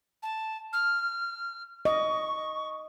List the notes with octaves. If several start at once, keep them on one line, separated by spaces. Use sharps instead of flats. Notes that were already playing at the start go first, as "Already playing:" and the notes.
A5
F6
D#5 C#6